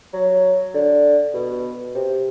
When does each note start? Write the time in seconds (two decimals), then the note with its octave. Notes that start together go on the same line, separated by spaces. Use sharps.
0.13 F#3
0.74 D3
1.34 B2
1.95 C3